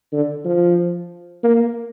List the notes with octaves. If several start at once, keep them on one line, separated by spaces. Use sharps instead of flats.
D3
F3
A#3